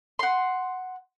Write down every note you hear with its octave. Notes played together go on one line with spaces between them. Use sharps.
F#5 C6